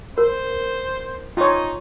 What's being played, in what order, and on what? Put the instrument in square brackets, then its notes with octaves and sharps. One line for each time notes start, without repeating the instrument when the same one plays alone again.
[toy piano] A#4 [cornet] C5
[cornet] D#4 [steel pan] F4 C#5